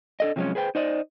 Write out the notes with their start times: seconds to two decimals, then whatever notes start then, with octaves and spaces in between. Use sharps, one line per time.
0.20 D4 A4 D#5
0.36 C3 F3 F#3 G#3 C4 C#4
0.55 G#4 B4 C5 G5
0.75 D#4 C5 D5 D#5